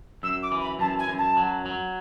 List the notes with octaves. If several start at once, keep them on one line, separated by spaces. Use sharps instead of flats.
F#2 E6
D6
E3
B5
F#2 A5
G#5
F#2
A5
F#3
F#3